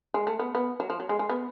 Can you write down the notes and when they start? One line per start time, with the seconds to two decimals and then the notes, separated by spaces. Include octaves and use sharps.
0.14 G#3
0.27 A3
0.39 B3
0.55 B3
0.80 F#3
0.90 F3
1.00 F#3
1.09 G#3
1.19 G#3
1.29 B3